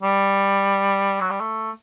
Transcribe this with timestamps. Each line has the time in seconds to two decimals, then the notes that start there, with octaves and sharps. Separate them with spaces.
0.03 G3
1.21 F#3
1.30 G3
1.40 A3